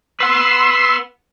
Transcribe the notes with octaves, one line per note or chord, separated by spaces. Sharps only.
B4 F#5 C6 E6